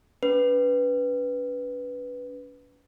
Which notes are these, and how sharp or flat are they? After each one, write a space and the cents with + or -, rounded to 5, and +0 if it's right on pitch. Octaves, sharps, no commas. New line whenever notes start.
C#4 +45 B4 +0